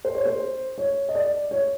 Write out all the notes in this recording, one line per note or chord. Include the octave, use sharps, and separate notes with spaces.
C5
C#5
C5
C#5
D#5
D5
C#5